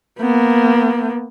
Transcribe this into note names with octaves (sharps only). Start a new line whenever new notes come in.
A#3 B3